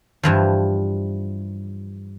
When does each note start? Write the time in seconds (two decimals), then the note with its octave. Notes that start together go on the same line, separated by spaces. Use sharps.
0.23 G2 E3 F3